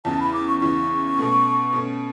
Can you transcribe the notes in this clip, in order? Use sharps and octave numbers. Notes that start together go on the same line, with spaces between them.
E2 C#3 E3 A5
B5
D6
C#6
E2 C#3 E3 C#6
B2 A3 C#4
B2 A3 C#4